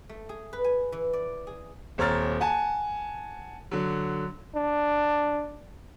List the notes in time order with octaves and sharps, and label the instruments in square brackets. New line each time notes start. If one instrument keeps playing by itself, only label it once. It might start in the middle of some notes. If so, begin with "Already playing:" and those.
[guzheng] A3
G#4
B4
G#5
E3
D5
G#4
[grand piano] D#1 C4 C#5 A#5 F6 A6
F#5 G#5 A5
D3 F#3
[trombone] D4